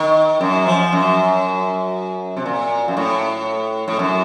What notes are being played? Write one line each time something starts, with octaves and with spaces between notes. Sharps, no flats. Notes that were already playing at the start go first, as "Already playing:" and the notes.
Already playing: D#3
F#2
F3
F#2
C3
A#2
F#2
A2
A2
F#2